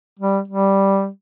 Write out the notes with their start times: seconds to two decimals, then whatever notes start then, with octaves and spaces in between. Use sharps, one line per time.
0.19 G3
0.48 G3